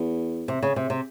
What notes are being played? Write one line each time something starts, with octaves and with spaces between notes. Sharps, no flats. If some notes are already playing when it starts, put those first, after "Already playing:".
Already playing: E2
C3
C#3
C3
C3